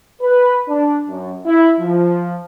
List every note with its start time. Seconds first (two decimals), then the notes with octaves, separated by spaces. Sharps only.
0.22 B4
0.69 D4
1.08 F#2
1.46 E4
1.80 F3